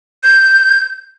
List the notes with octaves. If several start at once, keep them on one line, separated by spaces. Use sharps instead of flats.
G6